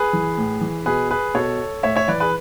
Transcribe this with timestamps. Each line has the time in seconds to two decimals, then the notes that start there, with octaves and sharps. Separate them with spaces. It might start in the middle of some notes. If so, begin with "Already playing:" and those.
Already playing: G#4 B4
0.13 E3
0.38 A2
0.61 E3
0.86 B2 G#4 B4
1.11 G#4 B4
1.34 B2 A4 C#5
1.83 A2 C#5 E5
1.96 C#5 E5
2.08 E3 B4 D5
2.20 G#4 B4